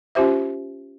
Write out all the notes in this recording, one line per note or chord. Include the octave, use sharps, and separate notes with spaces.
C#4 F4 G4 C5 E5